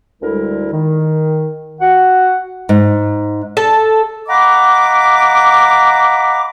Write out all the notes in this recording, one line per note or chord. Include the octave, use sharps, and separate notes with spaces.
D2 D3 G3 G#3 E4 A#4
D#3
F#4 F#5
G#2
A4
D#5 F5 F#5 A#5 B5 D6